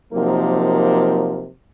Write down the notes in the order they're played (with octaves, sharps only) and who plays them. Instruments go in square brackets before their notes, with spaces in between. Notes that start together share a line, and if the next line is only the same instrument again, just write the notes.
[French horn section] C3 F3 F#3 A#3 D#4 A#4